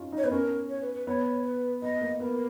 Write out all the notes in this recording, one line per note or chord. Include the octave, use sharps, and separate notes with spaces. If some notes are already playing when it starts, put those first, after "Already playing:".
Already playing: C#4 D#4 F4
D#4
C#5
B3 B4
C#4 A#4
C#5
B4
B4
B3 C#5
B4
B3 D#5
A#3
B3 A#4